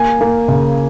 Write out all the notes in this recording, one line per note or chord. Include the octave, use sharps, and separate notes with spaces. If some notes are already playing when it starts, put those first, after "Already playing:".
Already playing: A#3 G#5
A#3
C#3